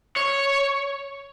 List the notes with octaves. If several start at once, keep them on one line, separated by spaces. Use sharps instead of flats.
C#5